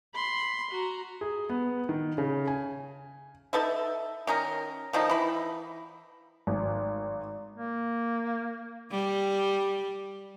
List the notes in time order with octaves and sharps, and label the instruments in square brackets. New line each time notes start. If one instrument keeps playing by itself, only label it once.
[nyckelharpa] B5 C6
F#4 A#5
[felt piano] G#4
B3
D#3
C#3
G#5
[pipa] D#4 A4 B4 E5
D#3 C#4 D#4 A#4
D#3 F3 A3 D#4
E3 B5
[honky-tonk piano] G#1
[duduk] A#3
[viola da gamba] G3